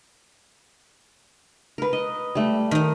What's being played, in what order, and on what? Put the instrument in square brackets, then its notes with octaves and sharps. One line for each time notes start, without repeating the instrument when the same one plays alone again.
[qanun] A#4 B4
D#5
G3 A3
[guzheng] D#3 D#4